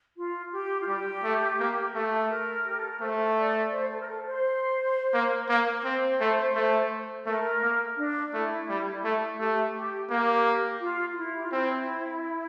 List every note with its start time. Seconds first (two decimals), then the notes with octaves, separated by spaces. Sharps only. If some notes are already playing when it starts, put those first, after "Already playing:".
0.17 F4
0.52 G4
0.81 F4
0.88 G3 G4
1.23 A3
1.60 A#3
1.95 A3
2.30 A#4
2.65 G4
2.77 A4
2.89 A#4
3.01 A3 C5
3.37 D5
3.72 C5
3.90 A4
4.01 A#4
4.08 A4
4.26 C5
5.14 A#3
5.49 A#3
5.84 C4 C5
6.21 A3
6.55 A3
7.26 A3 A#4
7.62 A#3
7.98 D4
8.33 A3 E4
8.69 G3
9.04 A3
9.39 A3 G4
9.75 G4
10.10 A#3 G4
10.81 F4
11.12 F4
11.17 E4
11.35 G4
11.43 F4
11.53 C4 E4